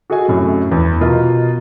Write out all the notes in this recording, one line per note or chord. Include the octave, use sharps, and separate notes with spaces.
F#4 G#4 A4 D#5 G#5
F#2 A2 C3
E2
B2 F4 A#4 D#5